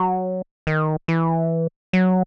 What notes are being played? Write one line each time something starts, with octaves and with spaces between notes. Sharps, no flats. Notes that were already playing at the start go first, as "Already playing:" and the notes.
Already playing: F#3
D#3
E3
F#3